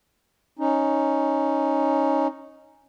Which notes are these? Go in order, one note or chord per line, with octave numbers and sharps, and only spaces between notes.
C#4 D#4